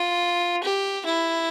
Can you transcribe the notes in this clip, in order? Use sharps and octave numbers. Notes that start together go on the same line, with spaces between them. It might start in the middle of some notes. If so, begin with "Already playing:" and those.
Already playing: F4
G4
E4